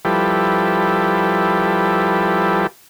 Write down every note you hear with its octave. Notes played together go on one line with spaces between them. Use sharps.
F3 G3 E4 G4 A4 B4